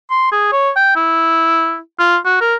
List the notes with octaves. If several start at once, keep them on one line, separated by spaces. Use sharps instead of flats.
C6
G#4
C#5
G5
E4
F4
F#4
A#4